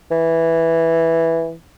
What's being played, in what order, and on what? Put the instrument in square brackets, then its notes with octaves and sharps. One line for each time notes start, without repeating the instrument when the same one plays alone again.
[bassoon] E3